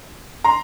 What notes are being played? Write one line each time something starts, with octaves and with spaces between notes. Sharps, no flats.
A#5 C6